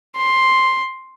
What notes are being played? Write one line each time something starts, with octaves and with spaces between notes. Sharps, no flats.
C6